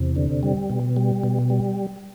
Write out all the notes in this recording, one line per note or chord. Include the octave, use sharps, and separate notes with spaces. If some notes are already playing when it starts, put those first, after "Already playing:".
Already playing: E2 C3
D3
G3
B2
G3
B2
G3